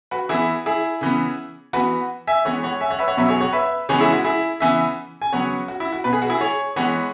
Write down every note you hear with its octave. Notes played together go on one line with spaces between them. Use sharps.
F#4 B4
E3 B3 E4 G#4
E4 G#4
C#3 E3 B3
E3 B3 F#4 B4
E5 G#5
E3 G#3 B3 C#5 F#5
C#5 F#5
E5 G#5
C#5 F#5
B4 E5
C#5 F#5
B2 F#3 B3 B4 E5
G#4 C#5
C#5 F#5
B4 E5
C#3 E3 G#3 B3 G#4 C#5
E4 G#4
F#4
E4 G#4
C#3 E3 B3 E5 G#5
G#5
C#3 F#3 B3 C#5 F#5
F#4
E4
F#4
B2 B3 B4
G#4
F#4
E4 G#4
G#4 C#5
E3 G#3 B3 C#5 F#5